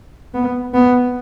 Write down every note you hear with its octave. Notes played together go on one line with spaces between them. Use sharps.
B3
B3